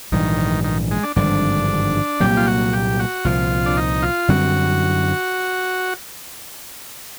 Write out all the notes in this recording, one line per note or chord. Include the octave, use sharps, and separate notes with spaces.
A#1 G#2 D#3 E3 G3
D#3
G#3
D4
G#1 G2 D3 F3 D4
C2 A#2 F#3 A#3 G4
F4
F#4
G4
F#4
C2 A#2 F3 F4
D4
D#4
F4
F#2 D3 G3 C4 F#4